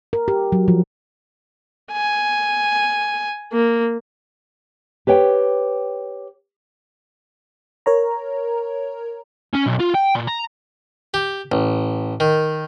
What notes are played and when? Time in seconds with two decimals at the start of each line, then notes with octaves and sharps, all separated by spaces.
0.13 A#4
0.28 G4
0.52 F#3
0.68 F3
1.92 G#5
3.53 A#3
5.07 G4 B4 C#5 G5
7.86 A#4 C#5 A#5
9.53 C#4
9.66 B1
9.79 F4
9.94 G5
10.15 A#2
10.27 A#5
11.14 G4
11.52 A1
12.20 D#3